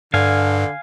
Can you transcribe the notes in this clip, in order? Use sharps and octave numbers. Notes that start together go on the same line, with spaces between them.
G2 D3 F5 G#5